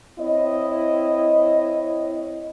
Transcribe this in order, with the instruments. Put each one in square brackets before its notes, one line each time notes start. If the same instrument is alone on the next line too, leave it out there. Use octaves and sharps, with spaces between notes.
[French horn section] C4 E4 C#5 D#5